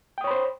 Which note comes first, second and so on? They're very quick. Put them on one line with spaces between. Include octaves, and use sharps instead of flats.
G5 D#6 C#5 B5 C5